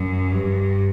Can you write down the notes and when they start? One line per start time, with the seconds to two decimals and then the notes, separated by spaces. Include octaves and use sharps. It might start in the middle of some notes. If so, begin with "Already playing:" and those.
Already playing: F#2
0.32 G2